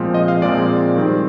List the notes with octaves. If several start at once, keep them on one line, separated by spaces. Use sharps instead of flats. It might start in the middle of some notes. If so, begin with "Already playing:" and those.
Already playing: A#2 F3 G#3 C4
D#5
F5
A#2 F3 G#3 C4 D5
D#3 G3 C4